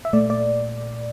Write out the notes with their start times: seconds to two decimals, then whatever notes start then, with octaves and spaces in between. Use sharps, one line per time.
0.05 E5
0.13 A#2 A3 D5
0.30 D5